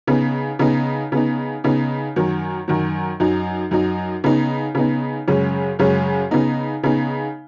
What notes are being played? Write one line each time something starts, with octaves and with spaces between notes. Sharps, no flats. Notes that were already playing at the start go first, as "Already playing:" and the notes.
C#3 B3 D#4
C#3 B3 D#4
C#3 B3 D#4
C#3 B3 D#4
F#2 D#3 F#3
F#2 D#3 F#3
F#2 F#3 D#4
F#2 F#3 D#4
C#3 B3 D#4
C#3 B3 D#4
F#2 C#3 G#3 C#4
F#2 C#3 G#3 C#4
C#3 B3 D#4
C#3 B3 D#4